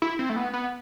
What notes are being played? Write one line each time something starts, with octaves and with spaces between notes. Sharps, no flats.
E4
C4
A3
B3
B3